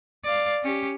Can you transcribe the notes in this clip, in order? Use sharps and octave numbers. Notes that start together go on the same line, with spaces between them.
D5 F5
C#4 G4